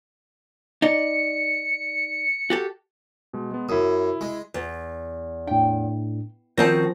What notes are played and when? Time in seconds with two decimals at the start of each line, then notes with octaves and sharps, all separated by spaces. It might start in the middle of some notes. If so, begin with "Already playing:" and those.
0.82 D#4 D5 C#7
2.50 F#4 G4 A4
3.33 B2 G#3
3.51 G#3 B3
3.69 F#2 E4 D#6
4.21 G#3
4.54 E2
5.47 A2 D4 G5
6.58 D#3 F3 C4 C#4 F#4 F#5 A5 A#6